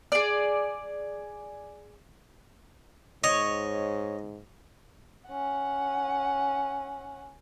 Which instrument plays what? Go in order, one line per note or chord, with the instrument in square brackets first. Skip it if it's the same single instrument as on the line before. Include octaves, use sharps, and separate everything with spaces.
[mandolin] G#4 D5
[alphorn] G#2 [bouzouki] C#5 [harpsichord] D#5
[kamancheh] C#4 F#5